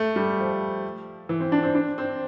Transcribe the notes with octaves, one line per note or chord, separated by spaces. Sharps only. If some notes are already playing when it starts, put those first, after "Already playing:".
Already playing: A3
G3
F3
E3
C4
D4
C4
D4
C4